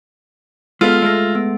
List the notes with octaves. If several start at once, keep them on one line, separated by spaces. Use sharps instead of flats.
G#3 B3 F4 A4 E6 F6
G#3 A3 E6 A#6
B3 D7